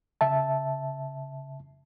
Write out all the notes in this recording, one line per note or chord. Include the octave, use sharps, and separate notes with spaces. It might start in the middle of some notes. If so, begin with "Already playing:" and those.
C#3 E5 A5